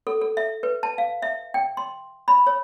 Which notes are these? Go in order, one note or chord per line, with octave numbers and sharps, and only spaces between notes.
A4
A4
E5
B4
A5
F5
E5
G5
C6
B5
C#5